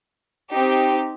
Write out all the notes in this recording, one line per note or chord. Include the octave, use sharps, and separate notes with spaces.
C4 D#4 G4